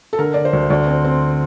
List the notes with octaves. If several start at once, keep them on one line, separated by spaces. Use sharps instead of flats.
A4
D3 A#4
D3 D5
C5
D2
D2 D5
C4
C4